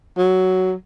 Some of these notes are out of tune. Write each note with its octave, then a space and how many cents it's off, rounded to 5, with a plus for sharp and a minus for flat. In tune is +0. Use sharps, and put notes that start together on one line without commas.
F#3 +10